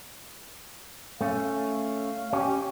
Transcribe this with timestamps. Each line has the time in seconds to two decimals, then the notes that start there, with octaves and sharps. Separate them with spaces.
1.21 A3 C#4 F5
2.33 C#4 G4